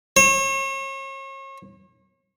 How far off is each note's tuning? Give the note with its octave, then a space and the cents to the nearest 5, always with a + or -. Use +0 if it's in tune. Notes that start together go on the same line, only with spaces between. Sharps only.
C#5 -40